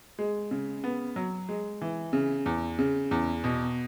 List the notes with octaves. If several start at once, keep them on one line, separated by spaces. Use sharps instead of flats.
G#3
C#3
B3
F#3
G#3
E3
C#3
E2
C#3
E2
B2